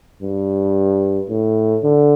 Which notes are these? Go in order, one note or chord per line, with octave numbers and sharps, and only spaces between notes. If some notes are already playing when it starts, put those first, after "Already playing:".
G2
A2
D3